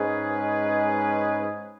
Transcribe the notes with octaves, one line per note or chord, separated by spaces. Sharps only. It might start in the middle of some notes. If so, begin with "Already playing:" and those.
Already playing: G#2 G#3 C#4 G#4 B4